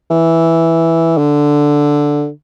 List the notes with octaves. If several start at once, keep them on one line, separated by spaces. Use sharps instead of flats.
E3
D3